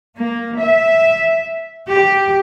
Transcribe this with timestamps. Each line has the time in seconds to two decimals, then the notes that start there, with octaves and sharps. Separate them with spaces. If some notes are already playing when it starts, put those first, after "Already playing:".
0.15 A#3
0.58 E5
1.88 G4